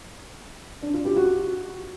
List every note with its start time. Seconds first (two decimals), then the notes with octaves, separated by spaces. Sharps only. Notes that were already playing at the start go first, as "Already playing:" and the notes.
0.82 D4
0.94 F4
1.05 G4
1.16 F#4